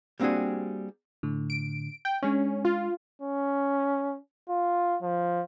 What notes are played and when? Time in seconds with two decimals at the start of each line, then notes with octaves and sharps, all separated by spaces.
0.20 G3 A#3 C4 D4 F#4 G#4
1.23 A2 D3
1.50 D7
2.05 G5
2.23 G#3 C#4 D4
2.65 F4
3.22 C#4
4.49 F4
5.02 F3